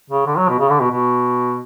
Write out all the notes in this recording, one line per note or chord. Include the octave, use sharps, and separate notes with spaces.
C#3
D3
F#3
B2
C#3
D3
B2
B2